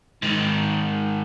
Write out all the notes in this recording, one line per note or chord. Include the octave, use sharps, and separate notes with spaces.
G#2 D#3